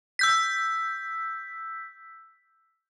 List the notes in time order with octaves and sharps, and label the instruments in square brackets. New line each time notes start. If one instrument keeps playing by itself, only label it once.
[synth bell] E6 G6 B6